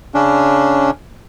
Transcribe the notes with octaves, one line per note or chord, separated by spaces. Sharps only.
C#3 C#4 D4